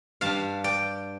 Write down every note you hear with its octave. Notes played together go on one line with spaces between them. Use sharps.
G2 G3 D4 F5 A5
D5 G5